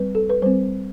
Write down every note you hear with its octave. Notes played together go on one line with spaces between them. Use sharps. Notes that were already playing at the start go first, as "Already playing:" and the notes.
Already playing: G3 C4 B4
A4
B4
G3 C4 C5